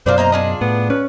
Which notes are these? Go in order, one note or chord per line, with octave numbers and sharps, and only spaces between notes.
F#2 B2 F4 A#4 C5 D5
A#3 D#5 A#5
D4 F4 G#4 D#5
A2 B3
C#4 B4